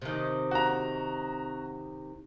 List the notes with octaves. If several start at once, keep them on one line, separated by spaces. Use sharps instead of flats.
C3 D#3
F#4 A#5